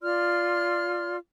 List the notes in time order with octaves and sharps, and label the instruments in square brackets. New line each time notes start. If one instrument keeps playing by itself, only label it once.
[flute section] F4 D5 C6 F6